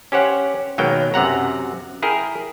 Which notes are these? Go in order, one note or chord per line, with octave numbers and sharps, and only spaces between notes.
C#4 G4 C5 C#5 F#5
D#2 B2 F#3 G#3 A#3 G5
F#2 C3 F#5 A#5
E4 G#4 A#4 G5